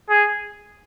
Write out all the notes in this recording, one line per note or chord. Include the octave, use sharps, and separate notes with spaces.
G#4